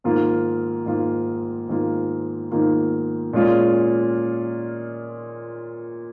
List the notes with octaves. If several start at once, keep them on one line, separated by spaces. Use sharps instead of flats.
G#2 D#3 A#3 F4
G#2 D#3 A#3 F4
G#2 D#3 A#3 F4
G#2 D#3 A#3 F4
A#2 G#3 C#4 F4